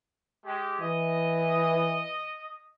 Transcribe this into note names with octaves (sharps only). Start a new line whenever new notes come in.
G#3 G4
E3 D#5